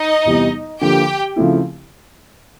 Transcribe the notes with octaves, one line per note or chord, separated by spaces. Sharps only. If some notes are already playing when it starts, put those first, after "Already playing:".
Already playing: D#4 D#5
E2 C3 E3 G3 B3
D3 F3 A#3 G4 G5
C#3 F3 A3 C4 E4